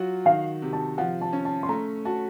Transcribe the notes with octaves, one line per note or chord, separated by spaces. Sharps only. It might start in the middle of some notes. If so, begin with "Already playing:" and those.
Already playing: F#3 F4 F#4
D#3 F5
C3
A5
F3 F#5
A5
C#4
A5
C6
A3 A#5
F#4 A5